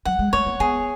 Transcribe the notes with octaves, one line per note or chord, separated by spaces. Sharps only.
F#3 F#5
G#3
A3 C#5
A#3
B3 G#4